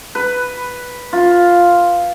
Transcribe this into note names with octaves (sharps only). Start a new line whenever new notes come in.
B4
F4